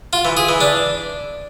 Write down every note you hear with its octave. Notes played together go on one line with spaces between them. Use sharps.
F4
E3
G#4
E3
D4